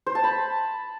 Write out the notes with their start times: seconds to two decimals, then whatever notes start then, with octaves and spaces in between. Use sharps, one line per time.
0.06 C5
0.15 A5
0.24 B5